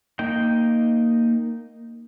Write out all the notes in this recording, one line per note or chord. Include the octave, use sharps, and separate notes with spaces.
A#3 D#4 G5